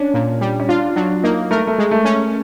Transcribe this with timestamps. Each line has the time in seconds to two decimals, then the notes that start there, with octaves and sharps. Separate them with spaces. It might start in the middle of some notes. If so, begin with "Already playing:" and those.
Already playing: C#4 D4
0.14 A#2
0.41 G3
0.60 C#4
0.69 D4 F4
0.96 F#3 D4
1.23 A#3 D#4
1.51 A3 A#4
1.67 A3
1.78 G#3
1.91 A3
2.05 C#4